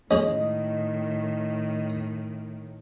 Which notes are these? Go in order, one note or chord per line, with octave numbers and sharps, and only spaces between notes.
A2 D#3 G#3 C#4 D#5